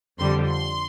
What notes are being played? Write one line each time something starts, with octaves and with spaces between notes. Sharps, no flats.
F2 D3 G3 C6
C6